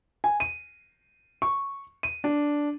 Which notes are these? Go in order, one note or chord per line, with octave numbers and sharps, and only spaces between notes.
G#5
D#7
C#6
D#7
D4